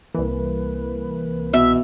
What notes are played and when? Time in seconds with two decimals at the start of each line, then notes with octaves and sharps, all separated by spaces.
0.14 C2 E3 A#3 B4
1.53 B2 E5